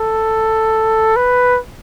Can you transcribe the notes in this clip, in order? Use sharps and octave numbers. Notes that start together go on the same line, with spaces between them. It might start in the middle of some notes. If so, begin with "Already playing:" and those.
Already playing: A4
B4